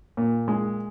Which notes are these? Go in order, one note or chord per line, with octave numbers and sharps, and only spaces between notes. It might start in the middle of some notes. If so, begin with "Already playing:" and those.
A#2
G#3